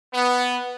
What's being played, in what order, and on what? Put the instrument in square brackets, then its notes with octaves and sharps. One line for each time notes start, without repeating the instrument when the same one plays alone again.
[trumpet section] B3